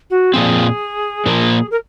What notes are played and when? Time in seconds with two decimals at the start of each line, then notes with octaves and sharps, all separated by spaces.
0.10 F#4
0.34 A#2 F3 C4 G#4
1.26 A#2 F3 A#3
1.71 A#4